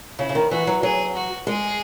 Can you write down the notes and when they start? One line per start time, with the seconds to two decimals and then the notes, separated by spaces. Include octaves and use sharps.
0.19 C#3 E4
0.29 C#3
0.35 D#3
0.51 E3 F#4
0.67 F#3
0.83 F#3 G#4
1.15 F#4
1.47 G#3 G#4